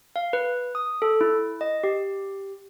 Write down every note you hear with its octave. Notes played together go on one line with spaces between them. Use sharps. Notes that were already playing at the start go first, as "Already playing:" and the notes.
F5
B4
D#6
A4
E4
D#5
G4